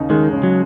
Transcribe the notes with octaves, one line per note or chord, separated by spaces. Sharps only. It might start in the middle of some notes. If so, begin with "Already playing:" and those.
Already playing: D#2 C#3 D#4
D#3 G#3
C#3
F#3